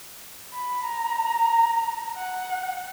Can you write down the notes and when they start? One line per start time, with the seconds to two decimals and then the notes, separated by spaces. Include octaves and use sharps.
0.54 B5
0.84 A#5
2.17 F#5